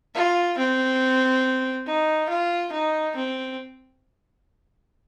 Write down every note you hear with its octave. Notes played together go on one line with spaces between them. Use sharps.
F4
C4
D#4
F4
D#4
C4